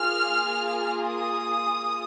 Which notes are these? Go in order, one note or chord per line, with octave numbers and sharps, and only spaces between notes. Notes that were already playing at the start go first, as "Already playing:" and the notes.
Already playing: A#3 F4 G#4 F6
D#6